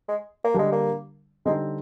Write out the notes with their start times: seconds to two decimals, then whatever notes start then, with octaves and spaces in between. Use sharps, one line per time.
0.09 G#3
0.44 A#3
0.54 D3 G3 G#3 D4
0.72 A#3
1.45 D3 G3 G#3 C4 D#4